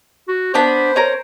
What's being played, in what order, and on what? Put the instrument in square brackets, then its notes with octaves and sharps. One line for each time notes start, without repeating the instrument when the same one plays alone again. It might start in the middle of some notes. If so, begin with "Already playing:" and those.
[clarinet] F#4
[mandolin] B3 D4 B5 [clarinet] C5
[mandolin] C#4 A#4